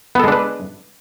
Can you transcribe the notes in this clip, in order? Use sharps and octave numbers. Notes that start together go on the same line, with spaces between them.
G#3 B3 D4 A4 B4